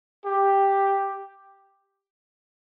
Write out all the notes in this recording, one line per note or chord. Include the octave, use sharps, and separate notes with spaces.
G4